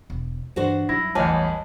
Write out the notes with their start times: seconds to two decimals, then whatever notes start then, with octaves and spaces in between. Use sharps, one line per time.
0.10 E1
0.56 G2 E3 D4 F#4 C5
0.89 F#2 G3 E4 A#6
1.15 A1 E2 C#5 D#5 G#5 A5